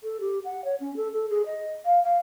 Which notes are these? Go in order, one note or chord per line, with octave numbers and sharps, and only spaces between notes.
A4
G4
F#5
C#5
C#4
A4
A4
G#4
D#5
F5
F5